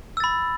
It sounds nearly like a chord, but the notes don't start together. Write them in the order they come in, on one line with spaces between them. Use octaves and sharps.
E6 A6 B5